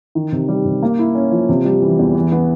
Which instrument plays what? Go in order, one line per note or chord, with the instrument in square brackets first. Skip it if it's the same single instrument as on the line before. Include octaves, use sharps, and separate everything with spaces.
[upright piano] D#3
C3
G3
C3
A#3
E4
C#4
F3
C3
G3
E3
E2
E3
B3